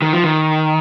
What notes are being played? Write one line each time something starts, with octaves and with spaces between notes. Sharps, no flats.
D#3
F3
D#3